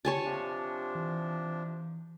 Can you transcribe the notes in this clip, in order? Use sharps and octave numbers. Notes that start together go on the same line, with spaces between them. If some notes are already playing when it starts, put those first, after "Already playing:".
G4 C#5 G#5 A5
C3 F3 D4
E3